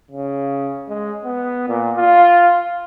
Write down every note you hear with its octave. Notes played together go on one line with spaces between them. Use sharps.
C#3
G#3
B3
A#2
F4